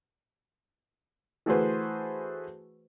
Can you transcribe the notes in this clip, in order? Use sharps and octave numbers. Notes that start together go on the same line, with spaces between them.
E3 A3 F#4 G#4 B4 C5